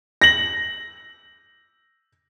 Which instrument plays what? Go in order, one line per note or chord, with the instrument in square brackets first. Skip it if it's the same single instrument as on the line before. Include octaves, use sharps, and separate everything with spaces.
[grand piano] A#6 F#7